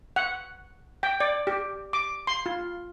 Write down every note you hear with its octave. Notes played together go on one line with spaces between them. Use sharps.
F#5
G5
D5
G4
D6
C6
F4